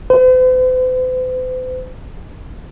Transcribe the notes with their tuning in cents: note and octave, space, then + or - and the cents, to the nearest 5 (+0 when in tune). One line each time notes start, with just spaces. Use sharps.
C5 -45